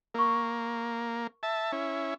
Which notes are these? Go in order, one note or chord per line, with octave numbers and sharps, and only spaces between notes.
A#3 A#4 C#6
E5 A5
C#4 E4